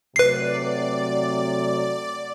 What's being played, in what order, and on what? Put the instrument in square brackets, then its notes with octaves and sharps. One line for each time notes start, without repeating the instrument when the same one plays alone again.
[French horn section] C3 F#3 A3 [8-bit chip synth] B4 C7 [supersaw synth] D5